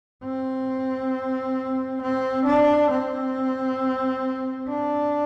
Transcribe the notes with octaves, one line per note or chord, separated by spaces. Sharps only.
C4
C4
D4
C4
D4